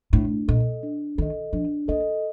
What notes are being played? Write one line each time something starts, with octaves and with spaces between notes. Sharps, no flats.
A2 D4
A#2 A4 D#5
D4
D#3 A4 D#5
F3 D4
A#3 A4 D#5